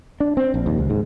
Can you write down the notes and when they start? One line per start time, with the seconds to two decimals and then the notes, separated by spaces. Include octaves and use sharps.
0.20 D4
0.37 C4
0.54 A#1
0.66 D#2
0.78 C#2
0.90 G#2